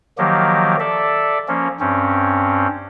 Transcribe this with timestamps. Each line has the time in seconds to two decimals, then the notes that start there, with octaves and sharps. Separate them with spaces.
0.18 D#3 F3 F#3 A#3 G4
0.80 A4 D5 E5
1.48 F3 A#3 C#4
1.80 G2 C4 C#4